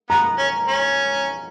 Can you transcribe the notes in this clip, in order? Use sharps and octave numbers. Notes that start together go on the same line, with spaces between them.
B3 A#5
C#4
C#4